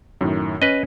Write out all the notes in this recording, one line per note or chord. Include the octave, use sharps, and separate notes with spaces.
F#2 A2 D#3
C#4 B4 D#5